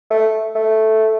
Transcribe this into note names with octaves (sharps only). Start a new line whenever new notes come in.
A3
A3